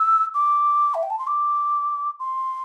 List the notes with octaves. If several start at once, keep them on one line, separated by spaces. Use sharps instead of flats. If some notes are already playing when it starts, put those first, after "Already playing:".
Already playing: E6
D6
E5
G5
A5
C6
D6
C6